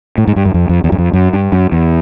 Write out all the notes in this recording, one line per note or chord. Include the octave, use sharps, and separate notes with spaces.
A2
G#2
G2
F#2
F2
F2
E2
F#2
F2
F#2
G2
F#2
E2